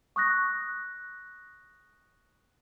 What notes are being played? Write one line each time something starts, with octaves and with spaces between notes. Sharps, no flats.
C#6 D#6 F#6 A#6